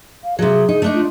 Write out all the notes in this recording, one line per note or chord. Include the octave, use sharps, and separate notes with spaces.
F5
C3 F#3 G#4
D#4
A3 D4 D#4
F4